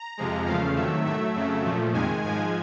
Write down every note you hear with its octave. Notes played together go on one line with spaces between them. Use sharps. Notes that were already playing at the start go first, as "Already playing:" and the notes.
Already playing: A#5
F2 C3 F3 G#3
E2 C#3 F3 A3 F5
C3 D#3 F#3 A3 E5
A2 F#3 A3 E5
F2 C#3 F#3 A3
A#2 F3 A3
F2 C3 D#3 G#3 G#5
G#2 F3 G#3 G#5